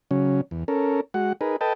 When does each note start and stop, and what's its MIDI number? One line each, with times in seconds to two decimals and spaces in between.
0.11 0.41 49
0.11 0.41 54
0.11 0.41 61
0.51 0.64 40
0.68 1.01 61
0.68 1.01 69
0.68 1.01 70
1.14 1.33 56
1.14 1.33 66
1.14 1.33 78
1.41 1.56 63
1.41 1.56 68
1.41 1.56 70
1.41 1.56 71
1.61 1.73 69
1.61 1.73 71
1.61 1.73 75
1.61 1.73 79
1.61 1.73 81